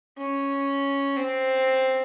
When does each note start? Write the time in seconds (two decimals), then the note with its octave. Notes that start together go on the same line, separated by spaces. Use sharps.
0.18 C#4
1.16 C4